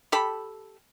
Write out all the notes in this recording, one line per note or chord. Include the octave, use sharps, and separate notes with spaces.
G4 A4 B5